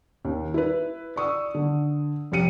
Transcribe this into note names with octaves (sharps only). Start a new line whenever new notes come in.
D#2
E4 B4
D5 C#6 D#6 E6
D3
F1 G4 C#7 D#7